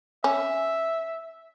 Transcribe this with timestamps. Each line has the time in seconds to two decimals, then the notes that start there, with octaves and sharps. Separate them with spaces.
0.24 C#4 E5